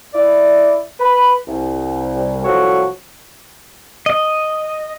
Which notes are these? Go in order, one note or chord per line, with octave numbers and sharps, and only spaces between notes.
E4 D5
B4 B5
C2
C2 F3 F#3 F#4 A4 C#5
D#5